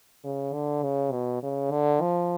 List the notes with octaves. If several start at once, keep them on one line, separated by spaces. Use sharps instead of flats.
C#3
D3
C#3
B2
C#3
D3
F3